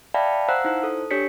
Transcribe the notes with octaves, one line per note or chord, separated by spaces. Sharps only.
D5 E5 F5 G5 A5 B5
C5 F5 F#5 A#5 E6 F#6
D#4 E4 C5
A4
D4 G4 C#5 B6 C#7